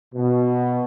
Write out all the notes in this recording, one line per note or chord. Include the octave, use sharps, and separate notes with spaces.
B2